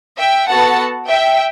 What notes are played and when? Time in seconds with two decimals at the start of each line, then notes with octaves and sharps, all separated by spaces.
0.18 E5 G5
0.48 B3 F#4 A4 F#5 A5
1.08 E5 G5